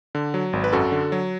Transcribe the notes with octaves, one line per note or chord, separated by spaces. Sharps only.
D3
F#3
G#1
B4
F#2 F#4 A4
D3
F#3